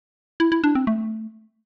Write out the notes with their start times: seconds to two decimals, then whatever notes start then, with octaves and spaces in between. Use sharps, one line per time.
0.40 E4
0.52 E4
0.64 D4
0.75 C4
0.87 A3